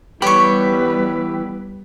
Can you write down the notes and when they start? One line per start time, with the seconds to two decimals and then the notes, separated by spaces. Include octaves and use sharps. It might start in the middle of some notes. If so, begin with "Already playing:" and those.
0.22 E3 G3 B3 G4 B4 C#5 B5 C#6